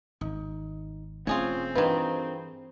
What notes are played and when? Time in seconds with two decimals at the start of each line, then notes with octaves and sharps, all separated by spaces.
0.21 G#1 D#4
1.27 E1 A3 C4 C#4 F4 G#4 C#5 G#5
1.75 G2 D#3 E3 D4 F4 G#4 B4